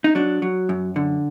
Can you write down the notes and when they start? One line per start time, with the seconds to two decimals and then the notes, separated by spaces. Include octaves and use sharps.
0.04 D#4
0.15 F#3 D4
0.42 F#3
0.69 F#2
0.96 D3